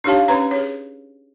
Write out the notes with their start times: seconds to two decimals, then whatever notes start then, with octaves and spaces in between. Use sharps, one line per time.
0.04 D4 D#4 G4 C#5 F5 A5
0.28 C#4 B4 C#5 A#5
0.51 G#4 C#5